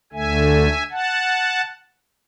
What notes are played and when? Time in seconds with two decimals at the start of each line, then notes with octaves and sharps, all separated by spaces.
0.13 D2 D3 A3 E5 G#5
0.91 F#5 A5